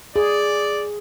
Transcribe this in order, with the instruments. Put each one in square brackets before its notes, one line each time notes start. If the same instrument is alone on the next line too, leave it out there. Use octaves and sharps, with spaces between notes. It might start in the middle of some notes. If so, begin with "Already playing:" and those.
[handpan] G#4 [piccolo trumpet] D5